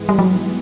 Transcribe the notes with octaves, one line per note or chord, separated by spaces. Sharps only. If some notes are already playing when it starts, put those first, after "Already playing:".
Already playing: G#2 E3 G#3 B3
G3
F#3